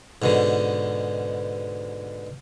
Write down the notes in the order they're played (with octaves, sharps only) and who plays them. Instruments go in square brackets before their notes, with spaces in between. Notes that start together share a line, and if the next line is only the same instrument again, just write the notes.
[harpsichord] G#2 B2 D3